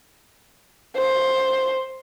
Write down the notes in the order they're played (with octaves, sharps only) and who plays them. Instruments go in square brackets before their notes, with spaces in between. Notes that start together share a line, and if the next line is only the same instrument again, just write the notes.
[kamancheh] C5